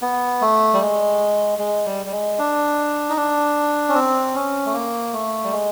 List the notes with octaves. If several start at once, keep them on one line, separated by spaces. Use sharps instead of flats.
B3
A3
G3
G#3
G#3
G3
G3
G#3
D4
D#4
D4
C#4
C4
C#4
A3
A#3
A3
G3
G#3